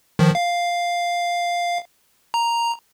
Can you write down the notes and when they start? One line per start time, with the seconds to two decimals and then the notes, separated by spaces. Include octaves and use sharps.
0.19 D#3 F3
0.35 F5
2.34 A#5